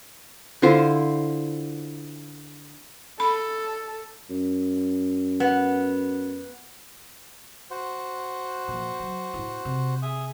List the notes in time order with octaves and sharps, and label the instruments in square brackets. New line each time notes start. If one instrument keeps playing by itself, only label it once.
[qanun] D3 E4 F4 C5
[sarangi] A4 [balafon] B5
[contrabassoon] F#2
[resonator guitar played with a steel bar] B3
[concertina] F#4 C5
[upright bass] A#2 F3
F#3
A2 E4
C3
[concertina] G#4 E5 D#6